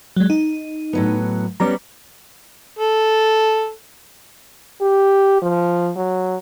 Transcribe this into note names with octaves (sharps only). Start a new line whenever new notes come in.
F#3 G#3
D#4
A2 F#3 B3
G3 B3 C#4 A#5 D6
A4
G4
F3
F#3